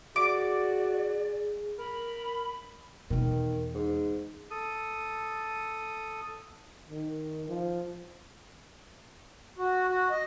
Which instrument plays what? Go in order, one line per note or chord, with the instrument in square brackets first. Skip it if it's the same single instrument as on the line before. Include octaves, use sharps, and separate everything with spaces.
[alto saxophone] F#4 [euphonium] G#4 [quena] D5 [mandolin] D6
[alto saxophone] A#4 [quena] B5
[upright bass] E2 B2 [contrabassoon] D#3
[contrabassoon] G#2
[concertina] A4 D#6
[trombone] D#3
F3
[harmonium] F#4
F#4
D#5